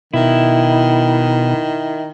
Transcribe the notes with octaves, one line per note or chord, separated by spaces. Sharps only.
B2 D#3 E4